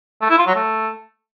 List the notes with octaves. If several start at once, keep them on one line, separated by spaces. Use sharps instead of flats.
A3
E4
F4
F#3
A3